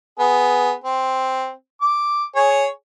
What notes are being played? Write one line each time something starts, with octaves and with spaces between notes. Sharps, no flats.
B3 G#4
C4
D6
G#4 C#5